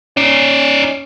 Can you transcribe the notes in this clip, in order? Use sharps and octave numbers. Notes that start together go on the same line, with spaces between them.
C#4 D#4 D5